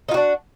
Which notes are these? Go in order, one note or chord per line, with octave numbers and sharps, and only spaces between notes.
D4 D#4 F4 F#4